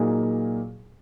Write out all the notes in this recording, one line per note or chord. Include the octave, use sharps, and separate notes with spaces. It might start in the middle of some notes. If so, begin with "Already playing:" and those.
Already playing: A#2 F#3 A#3 D#4 G#4